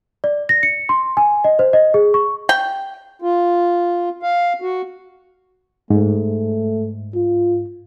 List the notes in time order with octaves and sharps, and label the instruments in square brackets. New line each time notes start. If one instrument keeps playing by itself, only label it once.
[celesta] D5
A#6
C#7
C6
G#5
D#5
C5
D#5
G#4
C#6
[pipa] G5
[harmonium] F4
F5
F#4
[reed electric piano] G#2 [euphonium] A3
[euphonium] F4